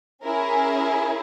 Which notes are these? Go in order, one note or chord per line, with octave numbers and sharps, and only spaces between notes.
C#4 E4 G#4 A#4